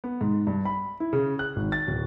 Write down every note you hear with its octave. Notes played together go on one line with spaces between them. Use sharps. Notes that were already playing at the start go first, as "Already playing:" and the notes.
B3
G#2
G2
B5
E4
C#3
F#6
G#1
A6
D1